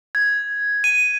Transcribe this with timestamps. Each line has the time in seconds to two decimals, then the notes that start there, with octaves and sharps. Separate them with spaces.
0.15 G#6
0.84 D#7